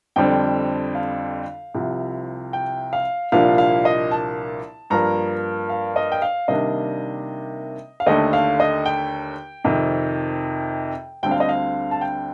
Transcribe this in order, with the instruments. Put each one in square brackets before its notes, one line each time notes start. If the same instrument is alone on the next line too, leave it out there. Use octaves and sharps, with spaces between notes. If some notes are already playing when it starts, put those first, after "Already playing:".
[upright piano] F2 D3 G3 C4 G5
F5
C2 C3 F3
G5
F5
C2 A#2 F3 A#3 D4 F5
F5
D#5
A5
G2 F3 A#3 A#5
F5
D#5
G5
F5
C3 D#3 G3 A#3 D4 D#5
F5
D#2 D3 A3 D#5
F5
D#5
G5
F2 C3 D#3
D2 D3 G3 C4 G5
F5
D#5
F5
A5
G5